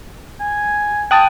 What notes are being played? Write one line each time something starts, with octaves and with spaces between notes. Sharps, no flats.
G#5
G5 A5 D#6 F#6